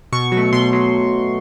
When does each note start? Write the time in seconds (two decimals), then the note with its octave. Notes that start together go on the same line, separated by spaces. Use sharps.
0.13 B2 C#6
0.32 F#3
0.37 A3
0.53 B2 C6
0.73 F#3